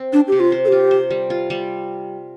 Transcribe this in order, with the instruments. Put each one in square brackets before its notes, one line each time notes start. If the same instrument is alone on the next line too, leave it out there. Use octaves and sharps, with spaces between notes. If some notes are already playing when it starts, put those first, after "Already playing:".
Already playing: [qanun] C4
[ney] D4 [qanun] C5
[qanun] C3 [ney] G4
[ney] F4
[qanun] C5
[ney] A4
[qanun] F4 [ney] G4
[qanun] C5
G3
F4
G3